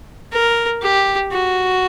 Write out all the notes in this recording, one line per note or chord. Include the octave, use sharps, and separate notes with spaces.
A#4
G4
F#4